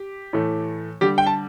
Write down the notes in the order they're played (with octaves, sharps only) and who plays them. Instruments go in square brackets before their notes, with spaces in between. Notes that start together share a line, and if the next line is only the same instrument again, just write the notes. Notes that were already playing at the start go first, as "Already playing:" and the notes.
Already playing: [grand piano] G4
A2 E3 A3
D3 G3 G4
G5
A5